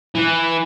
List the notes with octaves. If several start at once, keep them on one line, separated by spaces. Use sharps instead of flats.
E3